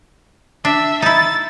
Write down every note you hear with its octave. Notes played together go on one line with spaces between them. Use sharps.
D4 E5
D#4 E4 A6